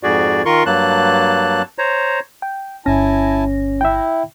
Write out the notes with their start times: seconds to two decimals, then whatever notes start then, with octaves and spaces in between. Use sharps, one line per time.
0.03 F2 G#2 F#4 G#4 D5
0.45 D#3 F4 A#4 C6 C#6
0.66 G2 F#3 A#3 A5 F#6
1.78 C5 C#5 A#5
2.42 G5
2.86 G1 C#4 E4 G#5 A5 A#6
3.81 E4 E5 G5